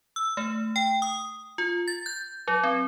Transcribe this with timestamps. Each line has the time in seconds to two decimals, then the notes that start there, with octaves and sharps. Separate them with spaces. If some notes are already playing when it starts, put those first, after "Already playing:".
0.16 E6
0.37 A3
0.76 G5
1.02 D#6
1.58 F4
1.88 A6
2.06 G6
2.48 F#3
2.63 C4